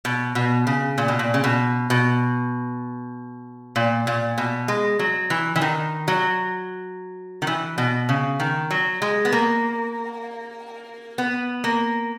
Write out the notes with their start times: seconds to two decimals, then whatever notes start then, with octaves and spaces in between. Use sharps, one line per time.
0.05 B2
0.35 B2
0.67 C#3
0.98 A#2
1.08 B2
1.19 A#2
1.34 C#3
1.44 B2
1.90 B2
3.76 A#2
4.07 A#2
4.38 B2
4.68 G#3
4.99 F#3
5.30 E3
5.56 E3
5.62 D#3
6.08 F#3
7.42 D#3
7.47 E3
7.78 B2
8.09 C#3
8.40 D#3
8.71 F#3
9.02 G#3
9.25 B3
9.32 A#3
11.18 B3
11.64 A#3